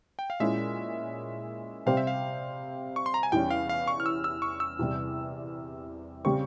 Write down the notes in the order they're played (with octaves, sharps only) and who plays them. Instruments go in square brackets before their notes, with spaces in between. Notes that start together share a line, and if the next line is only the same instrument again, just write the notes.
[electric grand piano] G5
F5
[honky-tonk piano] A#2 G#3 C#4 E4 [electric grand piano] E5
[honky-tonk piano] C3 G3 C4 G4 C5 [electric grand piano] F5
[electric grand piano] E5
F5
C#6
C6
A#5
G#5
[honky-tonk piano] E2 E3 G3 C#4 [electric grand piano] G5
[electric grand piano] F5
F5
C#6
F6
E6
E6
C#6
E6
[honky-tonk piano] E2 C3 G3
[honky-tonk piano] C#3 G3 C4 G4 [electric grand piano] C#6